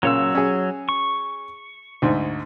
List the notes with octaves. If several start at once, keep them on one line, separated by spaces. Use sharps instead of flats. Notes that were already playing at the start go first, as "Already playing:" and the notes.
A#2 C#3 F#3 C#5 E6
C#4 G#4
C#6
D2 G#2